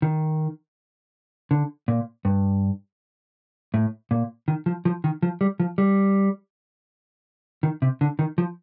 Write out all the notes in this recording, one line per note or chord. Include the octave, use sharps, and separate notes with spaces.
D#3
D3
A#2
G2
A2
A#2
D#3
F3
F3
D#3
F3
G3
F3
G3
D#3
C3
D3
D#3
F3